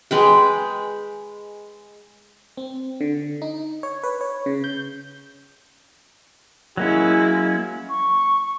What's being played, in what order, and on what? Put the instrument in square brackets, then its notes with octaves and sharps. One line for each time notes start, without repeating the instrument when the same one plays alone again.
[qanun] G#3 B4 G5
[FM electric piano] C4
D3
D#4
C#5
B4
C#5
C#3
G6
[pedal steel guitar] F#3 A#3 C#4 [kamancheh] G#3 E4
[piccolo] C#6